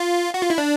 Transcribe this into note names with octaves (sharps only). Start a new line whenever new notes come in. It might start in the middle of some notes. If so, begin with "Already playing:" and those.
Already playing: F4
F#4
F4
E4
D4